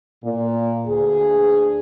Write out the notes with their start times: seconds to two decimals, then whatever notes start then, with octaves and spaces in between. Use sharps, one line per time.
0.24 A#2
0.87 D2 G#4